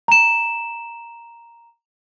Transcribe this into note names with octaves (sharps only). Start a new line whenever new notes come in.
A#5 E7